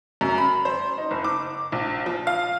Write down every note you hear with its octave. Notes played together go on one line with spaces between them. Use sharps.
F#2
B5
C5
D#4
F#1
D6
A#1
F3
F5